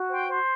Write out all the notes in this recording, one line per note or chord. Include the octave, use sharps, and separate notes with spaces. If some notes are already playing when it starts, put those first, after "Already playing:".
Already playing: F#4
C5 G5
C5